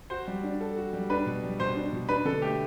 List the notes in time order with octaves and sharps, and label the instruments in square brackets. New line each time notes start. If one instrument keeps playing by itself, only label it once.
[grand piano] F#4 [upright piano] C5
[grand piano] G3
D4
A4
F#4
G3
[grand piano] D4 [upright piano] B4
[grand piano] B2
G3
[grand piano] B2 [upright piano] C5
[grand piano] D4
B2
[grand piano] D4 [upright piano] B4
[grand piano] D3 [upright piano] A4
[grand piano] A3 [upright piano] G4